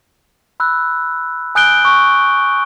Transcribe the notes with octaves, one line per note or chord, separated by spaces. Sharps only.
B5 E6 F#6
G#5 D#6 F#6 G6 D7 G7
C#6